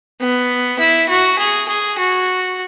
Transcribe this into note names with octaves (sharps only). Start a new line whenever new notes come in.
B3
E4
F#4
G#4
G#4
F#4